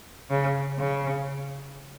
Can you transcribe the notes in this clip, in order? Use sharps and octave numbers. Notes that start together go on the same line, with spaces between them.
C#3
C#3